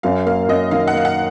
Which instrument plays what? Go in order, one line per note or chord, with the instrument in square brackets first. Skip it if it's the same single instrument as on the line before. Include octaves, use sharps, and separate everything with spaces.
[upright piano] F#2 [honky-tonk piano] F5
[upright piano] A#3 [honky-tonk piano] F5
[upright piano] F#2 [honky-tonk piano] D#5
[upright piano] D#3 [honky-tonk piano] F5
[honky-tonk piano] F#5
[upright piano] A#3 [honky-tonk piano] F5
[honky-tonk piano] F#5